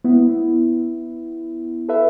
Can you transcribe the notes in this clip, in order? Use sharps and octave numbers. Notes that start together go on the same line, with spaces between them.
B3 E4
A4 B4 E5